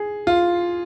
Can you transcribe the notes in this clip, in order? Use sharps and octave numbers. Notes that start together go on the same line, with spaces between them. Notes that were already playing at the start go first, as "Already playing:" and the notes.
Already playing: G#4
F4